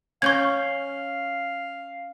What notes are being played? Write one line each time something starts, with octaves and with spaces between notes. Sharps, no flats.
C#4 F5 C#6 G6 G#6